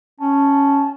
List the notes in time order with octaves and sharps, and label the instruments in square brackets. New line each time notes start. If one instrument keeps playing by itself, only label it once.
[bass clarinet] C#4 [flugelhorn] A5